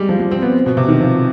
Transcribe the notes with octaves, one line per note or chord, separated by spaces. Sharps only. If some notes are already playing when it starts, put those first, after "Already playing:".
Already playing: G3 G#3
F3
G3
C4
B3
B2
C3
D#3
F3